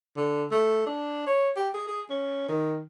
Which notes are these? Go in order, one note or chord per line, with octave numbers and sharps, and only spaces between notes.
D3
A3
D4
C#5
G4
G#4
G#4
C#4
D#3